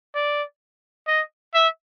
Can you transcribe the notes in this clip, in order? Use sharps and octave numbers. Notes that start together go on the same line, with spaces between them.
D5
D#5
E5